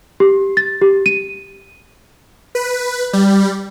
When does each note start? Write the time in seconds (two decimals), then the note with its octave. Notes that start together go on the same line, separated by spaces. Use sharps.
0.20 G4
0.57 A6
0.82 G4
1.06 D#7
2.55 B4
3.13 G3